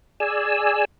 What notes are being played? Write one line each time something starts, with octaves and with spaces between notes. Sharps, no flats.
G#4 D5 G#5 E6